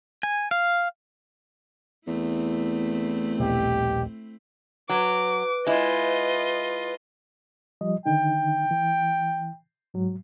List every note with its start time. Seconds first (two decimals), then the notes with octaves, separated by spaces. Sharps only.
0.23 G#5
0.51 F5
2.07 E2 A3 C4 E4
3.40 D#1 A#1 B2 G4
4.89 F#3 B4 D6
5.66 G#3 E4 F4 D#5
7.81 F3 G3 D#5
8.06 D3 D#3 D#4 G5
8.71 E3
9.94 G#2 F#3